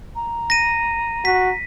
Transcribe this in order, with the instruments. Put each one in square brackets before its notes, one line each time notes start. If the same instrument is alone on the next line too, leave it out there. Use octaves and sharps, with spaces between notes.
[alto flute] A#5
[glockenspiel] A#6 D#7
[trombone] F#4 [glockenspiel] B6